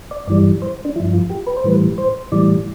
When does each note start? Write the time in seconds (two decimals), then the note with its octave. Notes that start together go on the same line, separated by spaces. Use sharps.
0.11 D5
0.27 G2 E3 G3 D5
0.62 C5
0.85 D4
0.96 F3 E4
1.00 G2
1.13 F4
1.30 G4
1.47 B4
1.57 C5
1.64 A2 E3 G3 B4
1.98 C5
2.32 A2 E3 G3 D5